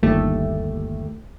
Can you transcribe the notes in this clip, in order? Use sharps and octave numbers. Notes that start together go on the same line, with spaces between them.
G1 D#2 A3 G4